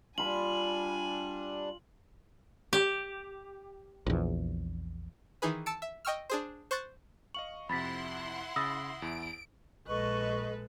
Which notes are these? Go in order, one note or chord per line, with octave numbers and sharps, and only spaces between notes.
G3 D4 F4 G#5 B5 F#7
G4
A#1 E2
D#3 E3 D#4 G#4 B4
A5 E6 C#7 D7
E5
D#5 G5 C#6 E6 F6
D4 G#4 C5
C5 C#6 F#6 G6 A6
D#5 F5 C#6 F#7
F2 C3 E4 F#5 B5 C6 A6 B6
C#3 B5 D#6 E6 A6 A#6
E2 E4 D7
A#1 G#3 A4 B4 D#5 C#6